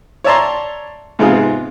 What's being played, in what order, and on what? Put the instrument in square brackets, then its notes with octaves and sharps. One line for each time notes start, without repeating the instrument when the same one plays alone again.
[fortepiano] C#5 D5 E5 A5 A#5 C6
G#2 C3 G#3 B3 F4 G#4